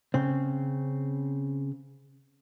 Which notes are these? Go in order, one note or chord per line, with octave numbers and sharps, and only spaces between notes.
C#3 C4